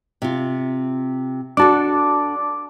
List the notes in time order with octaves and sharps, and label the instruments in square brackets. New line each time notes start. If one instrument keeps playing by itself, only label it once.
[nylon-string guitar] C3 F4
[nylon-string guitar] D4 F#4 A4 [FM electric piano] A5 D6